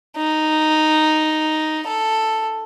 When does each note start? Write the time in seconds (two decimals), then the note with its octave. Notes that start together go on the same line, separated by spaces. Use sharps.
0.17 D#4
1.87 A4